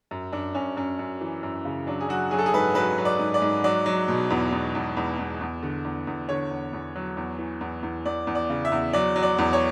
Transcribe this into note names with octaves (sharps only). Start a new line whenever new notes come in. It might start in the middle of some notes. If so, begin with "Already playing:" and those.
F#2
F#2 D4
F#2 C#4
F#2 C#4
F#2
E3
F#2
C#3
F#3 D4
G#4
F#3 F#4
F#3 G#4
A4
G#4
G#2 B4
F#3 B4
F#3
D5
G#2
D5
G#2
F#3 D5
F#3
B2
E2
E2
E2
E2
E2
E2
D3
E2
E2
D3 C#5
E2
E2
F#3
E2
E3
E2
E2
E2 D5
E2
D5
C#3
E5
E2
F#3 D5
F#3
D5
E2
C#5